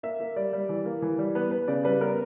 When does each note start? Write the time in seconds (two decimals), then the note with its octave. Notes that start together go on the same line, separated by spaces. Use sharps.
0.03 A#3 E5
0.20 A#3
0.36 G3 D5
0.53 G3
0.69 E3
0.86 A#3
1.02 E3
1.19 G3
1.35 B3 B4
1.51 B3 B4
1.68 C#3 D5
1.84 G3 B4
2.01 B3 A#4